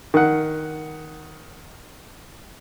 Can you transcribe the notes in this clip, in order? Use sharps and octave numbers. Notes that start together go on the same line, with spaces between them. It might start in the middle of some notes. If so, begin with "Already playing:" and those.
D#3 F#5